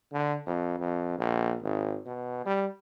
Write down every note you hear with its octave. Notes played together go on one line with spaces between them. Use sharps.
D3
F2
F2
A#1
G#1
B2
G3